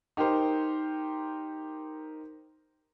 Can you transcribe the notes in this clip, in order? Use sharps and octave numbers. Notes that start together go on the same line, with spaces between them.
D#4 G4 A#4 C5